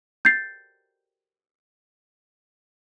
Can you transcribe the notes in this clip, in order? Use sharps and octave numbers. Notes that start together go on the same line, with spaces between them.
G6 A6 C7